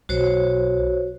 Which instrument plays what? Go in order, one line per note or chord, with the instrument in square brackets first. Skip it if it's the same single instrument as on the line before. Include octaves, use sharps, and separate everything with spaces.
[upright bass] B1 [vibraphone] F#4 C5 C#5